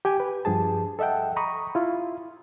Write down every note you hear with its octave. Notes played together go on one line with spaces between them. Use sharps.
G4 G5 G#5
B4
G2 F3 G#4 A5
A4 D#5 E5 F#5 G5
A#5 B5 C#6 D#6
E4 F4